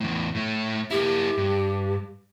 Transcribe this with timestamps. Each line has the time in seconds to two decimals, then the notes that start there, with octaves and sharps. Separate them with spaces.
0.01 E2 A2
0.35 A2 A3
0.91 A#3 E4 G4
1.38 G2